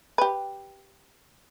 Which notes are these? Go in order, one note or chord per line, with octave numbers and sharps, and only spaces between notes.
G4 B4